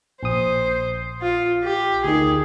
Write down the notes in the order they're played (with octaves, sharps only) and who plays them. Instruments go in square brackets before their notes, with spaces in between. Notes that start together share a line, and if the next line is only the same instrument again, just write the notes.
[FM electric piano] A#1 D#6 [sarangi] C5
[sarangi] F4
G4
[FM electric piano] D2 D#3 [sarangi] G#4